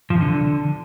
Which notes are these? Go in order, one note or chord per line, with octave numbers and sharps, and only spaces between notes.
F3
C3
D3